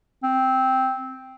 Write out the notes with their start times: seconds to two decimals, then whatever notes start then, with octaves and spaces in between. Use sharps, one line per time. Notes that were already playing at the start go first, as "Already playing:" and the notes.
0.23 C4